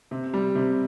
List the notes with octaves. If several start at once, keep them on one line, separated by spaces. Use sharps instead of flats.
C3
G3
C3